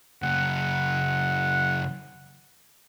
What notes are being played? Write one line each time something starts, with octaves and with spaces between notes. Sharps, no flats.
F#2 C#3 F#5